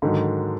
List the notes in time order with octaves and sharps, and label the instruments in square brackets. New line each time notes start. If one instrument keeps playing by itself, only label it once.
[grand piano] G#2 D#3 F#3 [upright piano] D3